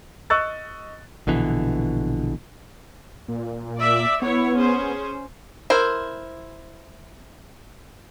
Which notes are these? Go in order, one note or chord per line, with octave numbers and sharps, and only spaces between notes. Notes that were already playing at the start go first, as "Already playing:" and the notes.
D#5 C#6 E6 F#6 A6
A#1 B2 D3 E3
A#2
D5 E5
B3 E4 C#5
C#4 G#4 C5
E4 A#4 C5